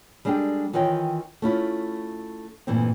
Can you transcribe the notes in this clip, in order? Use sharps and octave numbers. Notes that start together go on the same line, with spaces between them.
G3 G#3 D4 G4 A4 G5
D#3 E3 F4 C#5 D#5 G5
A3 C#4 E4 F4
G2 A#2 E3 A3 C4